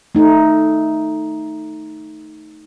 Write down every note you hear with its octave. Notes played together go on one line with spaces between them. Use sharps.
A3 D#4